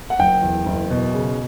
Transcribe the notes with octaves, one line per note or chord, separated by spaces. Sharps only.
F#5
F#1 G5
E2
F#1
B2
C#3